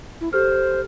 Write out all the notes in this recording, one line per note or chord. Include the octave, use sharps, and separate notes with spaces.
E4
G4 A4 C5 F6